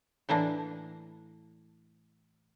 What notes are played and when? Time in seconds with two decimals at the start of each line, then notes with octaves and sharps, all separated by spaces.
0.29 A2 E3 A#3 D4